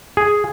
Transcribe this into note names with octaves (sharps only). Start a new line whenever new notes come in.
G#4